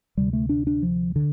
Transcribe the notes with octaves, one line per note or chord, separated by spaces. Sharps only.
D2 C3 G3
A3
D4
D4
F3
D3